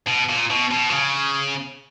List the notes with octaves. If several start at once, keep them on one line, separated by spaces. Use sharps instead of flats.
B2
A#2
B2
B2
D3
C#3